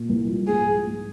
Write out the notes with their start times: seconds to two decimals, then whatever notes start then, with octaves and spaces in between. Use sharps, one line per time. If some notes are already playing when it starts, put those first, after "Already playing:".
Already playing: A#2
0.09 C2
0.29 F3
0.47 G#2 G#4
0.67 F3
0.86 G#2